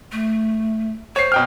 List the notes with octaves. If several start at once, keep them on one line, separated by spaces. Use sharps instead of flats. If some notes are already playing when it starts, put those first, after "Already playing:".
A3
C5 C#5 C7
B2 G5 F6